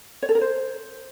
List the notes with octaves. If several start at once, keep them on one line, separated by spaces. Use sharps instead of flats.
C#5
A4
A#4
C5